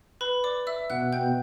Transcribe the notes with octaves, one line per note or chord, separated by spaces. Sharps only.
B4 B5
D5 D6
E5 E6
B2 F#5 F#6
G5 G6